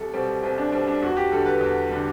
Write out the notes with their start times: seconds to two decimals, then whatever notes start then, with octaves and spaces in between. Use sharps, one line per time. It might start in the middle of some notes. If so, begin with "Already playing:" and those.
Already playing: C2 A4
0.14 B2 G3 C4
0.43 C2 C4
0.58 D4
0.72 B2 G3 C4
0.88 D4
1.02 E2 F#4
1.17 G4
1.31 D3 G3 A4
1.46 B4
1.60 E2
1.90 D3 G3